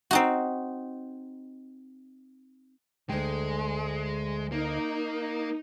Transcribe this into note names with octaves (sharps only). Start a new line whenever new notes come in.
C4 D#4 F#4
D2 G#3 G5
A#3 D#4